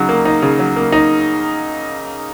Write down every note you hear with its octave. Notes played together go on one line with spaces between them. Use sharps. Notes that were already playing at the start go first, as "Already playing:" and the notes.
Already playing: C#3 F#3 D#4
A#3
D#4
C#3
F#3
A#3
D#4